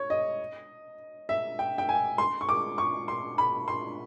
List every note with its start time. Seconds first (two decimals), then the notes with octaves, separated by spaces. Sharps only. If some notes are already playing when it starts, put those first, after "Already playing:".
Already playing: C#5
0.10 D#5
1.29 E5
1.59 G5
1.78 G5
1.89 G#5
2.18 C6
2.41 C#6
2.49 D6
2.78 C#6
3.08 C6
3.38 B5
3.68 C6